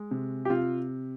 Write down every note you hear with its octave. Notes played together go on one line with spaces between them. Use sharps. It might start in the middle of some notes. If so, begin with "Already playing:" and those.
Already playing: G#3
C3
G4
C3 F4